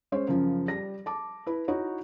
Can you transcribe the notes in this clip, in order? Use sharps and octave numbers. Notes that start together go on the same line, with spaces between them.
G#3 C#4 C5 C#5
F#2 C#3 F3
G3 A#6
A5 D6
E4 B4
D#4 E4 F#4 C#5